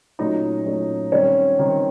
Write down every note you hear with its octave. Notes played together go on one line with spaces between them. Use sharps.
A#2 F#3 A3 C#4 D#4 D#5
A#2 F#3 A3 C#4
D#3 G3 C4 C#4 C#5
D#3 G3 C4